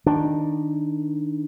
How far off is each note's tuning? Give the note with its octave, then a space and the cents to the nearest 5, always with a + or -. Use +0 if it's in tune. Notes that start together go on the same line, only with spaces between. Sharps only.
D#3 +0 D4 +0